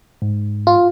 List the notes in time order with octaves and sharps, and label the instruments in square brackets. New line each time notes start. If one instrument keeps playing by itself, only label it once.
[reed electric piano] G#2
[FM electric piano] F4